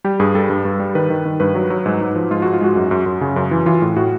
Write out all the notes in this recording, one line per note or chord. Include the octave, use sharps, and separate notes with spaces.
G3 G4
G2 G#4
G3 A4
G2
G2
G3
D#3 B4
D#3
D#3
G2 B4
F#3
F#3
G#2
G#2
F3
G#2 F4
G#2 F#4
F4
G#3 F#4
F#2
F#2
F#2
C#3
F#2
E3
E3 F4
A2
A2 F#4